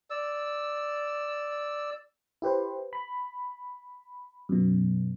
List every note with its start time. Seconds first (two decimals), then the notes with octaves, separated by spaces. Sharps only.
0.10 D5 E6
2.42 E4 G4 B4 C5
2.93 B5
4.49 F#2 B2